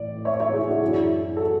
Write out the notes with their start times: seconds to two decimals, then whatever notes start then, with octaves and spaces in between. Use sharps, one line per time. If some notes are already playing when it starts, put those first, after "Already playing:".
Already playing: A2 E3 D5
0.25 C#5 E5
0.40 C#5 E5
0.53 E4 G#4
0.68 D4 F#4
0.82 F#2 E3 E4 G#4
1.37 F#4 A4